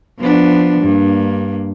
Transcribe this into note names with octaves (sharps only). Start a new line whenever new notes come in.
F3 B3 D4
G2 A#3